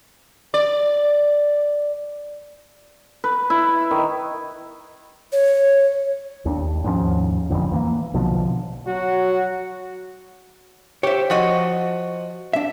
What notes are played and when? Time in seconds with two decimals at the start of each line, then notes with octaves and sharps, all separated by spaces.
0.54 D5
3.24 B4
3.50 E4
3.91 D#3
5.32 C#5
6.45 D#2 C4 D4
6.84 D#2 G#2 F3 C#4
7.50 E1 A1 F2 D3
7.72 E3 A3 A#3
8.14 B1 B2 D3 F3
8.87 F#3 F#4
11.03 G4 C5 C#5 E5
11.30 F3 F#4 D#5
12.53 D4 E5